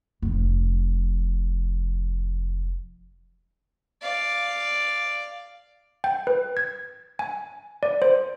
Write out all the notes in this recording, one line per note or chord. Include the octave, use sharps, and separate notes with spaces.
F1 F3
D5 F5
G5
B4
G#6
G#5
D5
C5